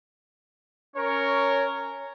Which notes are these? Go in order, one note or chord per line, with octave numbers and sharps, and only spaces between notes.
C#4 A#4 C#5